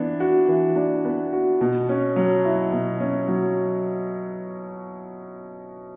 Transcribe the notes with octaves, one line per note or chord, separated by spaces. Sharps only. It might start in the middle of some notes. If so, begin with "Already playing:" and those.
Already playing: E3 B3 D4
F#4
E3
D4
B3
F#4
B2
C#4
F#3
E4
B2
C#4
F#3